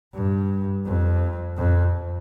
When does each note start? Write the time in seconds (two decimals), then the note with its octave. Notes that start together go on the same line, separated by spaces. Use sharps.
0.14 G2
0.85 F2
1.57 F2